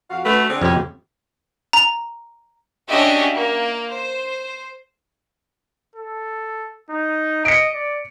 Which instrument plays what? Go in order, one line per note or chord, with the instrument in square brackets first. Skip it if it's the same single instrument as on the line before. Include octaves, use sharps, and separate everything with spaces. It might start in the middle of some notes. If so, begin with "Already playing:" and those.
[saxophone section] F2 F#4 F5
[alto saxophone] A3 [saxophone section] C#4 F#4 B4
[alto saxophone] D3 [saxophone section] C4 G#4
[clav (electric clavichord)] F2 G4 [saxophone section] B2 [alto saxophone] C#4
[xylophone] A#5
[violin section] C#4 D4 F#4 G4 D#5 E5
A#3
C5
[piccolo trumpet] A4
D#4
[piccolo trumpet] D#5 [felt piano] C#7 D7
[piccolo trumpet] D5